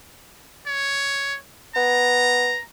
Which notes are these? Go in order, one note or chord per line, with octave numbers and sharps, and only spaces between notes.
C#5
B3 A#5